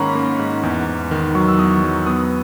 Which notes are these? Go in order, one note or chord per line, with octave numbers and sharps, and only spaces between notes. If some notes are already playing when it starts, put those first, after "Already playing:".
Already playing: G#2 D#3 A#3 C#4 F#5 A#5 B5 C#6
A#3
G#2
E2
E2
D#3
F#3 C#6
E6
E2 D#6
C#6
F#3
B3 D#6